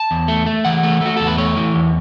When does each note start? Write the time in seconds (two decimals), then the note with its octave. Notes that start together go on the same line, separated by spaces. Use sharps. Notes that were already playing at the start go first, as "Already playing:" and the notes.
Already playing: A5
0.11 E2
0.28 A3
0.46 A3
0.65 E3 F#5
0.83 A3
1.01 A3 F#4
1.17 E2 A4
1.27 B4
1.38 A3 C#5
1.57 E3
1.75 E2